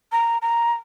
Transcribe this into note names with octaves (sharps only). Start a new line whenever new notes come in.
A#5
A#5